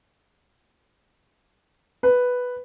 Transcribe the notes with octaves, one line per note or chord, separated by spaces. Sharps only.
B4